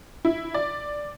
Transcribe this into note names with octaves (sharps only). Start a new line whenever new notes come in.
E4
D5